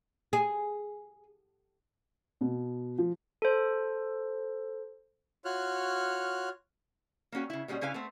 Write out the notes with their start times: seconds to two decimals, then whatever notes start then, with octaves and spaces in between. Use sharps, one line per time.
0.33 G#4
2.41 B2
2.98 F3
3.42 A4 C5
5.45 F4 F#4 C#5 F6 F#6
7.32 A#3 B3 C#4 F#4 G5
7.50 C#3 E4
7.68 A#2 G3 G#3 C#4 F#4
7.81 C#3 C#4 E4 B4 F5 G#5
7.94 A3 B3 C4